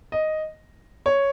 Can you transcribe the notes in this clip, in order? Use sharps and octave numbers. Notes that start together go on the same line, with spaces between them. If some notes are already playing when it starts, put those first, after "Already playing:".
D#5
C#5